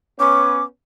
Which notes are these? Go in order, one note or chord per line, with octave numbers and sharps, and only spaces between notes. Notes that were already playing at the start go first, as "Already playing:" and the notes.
B3 C#4 D6